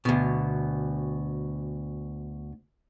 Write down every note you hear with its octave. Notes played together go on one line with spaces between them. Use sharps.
D2 B2